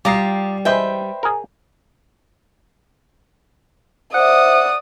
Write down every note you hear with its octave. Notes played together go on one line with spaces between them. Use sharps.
G3 F4 G4 A#5 D6 D#6 C7
E3 G#3 B4 C5 D#5 E5 G5
G#4 A#4
C5 D5 E5 F#5 D#6